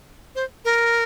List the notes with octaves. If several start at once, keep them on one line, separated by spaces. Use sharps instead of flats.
C5
A#4